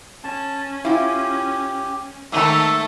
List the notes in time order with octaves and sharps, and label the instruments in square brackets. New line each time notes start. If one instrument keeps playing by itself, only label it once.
[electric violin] C#4 [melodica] A5
[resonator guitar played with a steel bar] E4 F4 [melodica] G4
[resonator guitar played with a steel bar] G#2 D#3 A#5 [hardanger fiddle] A3 A4 [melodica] E5